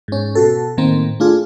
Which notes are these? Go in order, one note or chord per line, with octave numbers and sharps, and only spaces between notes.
G#2 C#4
B2 F#4 A4
A2 D#3 A#3 C4
A3 D4 F4 G#4